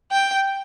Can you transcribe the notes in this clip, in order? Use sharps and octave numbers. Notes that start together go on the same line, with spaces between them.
G5